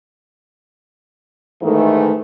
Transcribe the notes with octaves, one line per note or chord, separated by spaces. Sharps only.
G#2 D#3 E3 A3